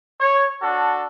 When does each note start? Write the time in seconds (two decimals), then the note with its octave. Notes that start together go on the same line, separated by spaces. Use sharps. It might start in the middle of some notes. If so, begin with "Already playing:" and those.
0.21 C#5
0.62 D4 F#4 A4